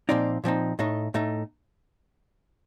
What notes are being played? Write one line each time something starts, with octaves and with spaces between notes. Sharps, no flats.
A#2 F3 C4 D#4 D5
A#2 F3 C4 D#4
A2 A3 D#4 D#5
A2 A3 D#4